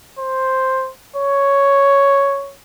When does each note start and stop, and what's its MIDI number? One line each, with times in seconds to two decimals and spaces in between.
0.18 0.90 72
1.16 2.54 73